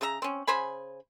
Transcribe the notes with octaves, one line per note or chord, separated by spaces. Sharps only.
C#3 G#4 E5 A#5
C4 C#4
C#3 C5 G#5 B5